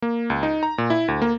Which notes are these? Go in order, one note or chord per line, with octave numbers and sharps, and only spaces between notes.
A#3
C#2
D#4
A#5
A#2
E4
D2
A#3